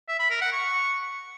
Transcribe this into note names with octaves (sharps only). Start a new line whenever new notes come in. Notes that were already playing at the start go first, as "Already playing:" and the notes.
E5
B5
A#4
F#5
C#6